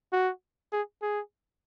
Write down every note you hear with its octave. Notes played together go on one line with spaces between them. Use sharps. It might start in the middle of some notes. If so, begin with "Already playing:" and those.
F#4
G#4
G#4